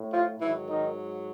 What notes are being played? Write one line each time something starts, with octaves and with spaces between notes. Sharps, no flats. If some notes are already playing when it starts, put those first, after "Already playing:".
Already playing: A2
F3 F4
G#2 D#3 E3 F#3 E4
D#3 D#4